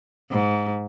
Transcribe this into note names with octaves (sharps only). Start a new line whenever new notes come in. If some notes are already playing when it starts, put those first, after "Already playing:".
G#2